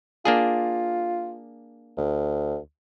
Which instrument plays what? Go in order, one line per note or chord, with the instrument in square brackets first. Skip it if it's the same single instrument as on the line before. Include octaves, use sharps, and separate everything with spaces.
[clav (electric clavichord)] A#3 D4 G#4 [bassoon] F4
[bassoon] D2